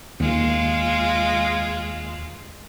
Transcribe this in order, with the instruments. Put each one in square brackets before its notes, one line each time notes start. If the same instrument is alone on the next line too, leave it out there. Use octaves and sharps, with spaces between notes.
[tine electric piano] D#2 [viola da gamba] G#3 F4